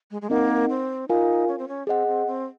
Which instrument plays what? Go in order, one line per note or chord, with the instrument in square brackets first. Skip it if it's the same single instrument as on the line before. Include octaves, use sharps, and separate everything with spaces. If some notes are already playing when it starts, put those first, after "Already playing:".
[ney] G#3
G#3
[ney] A#3 [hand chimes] C4 D#4 A#4 D#5 F#5
[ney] C4
[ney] D#4 [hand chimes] F4 A#4 F5 G#5
[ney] C#4
C4
C#4
[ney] C4 [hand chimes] G#4 D#5 F#5
[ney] C4
C4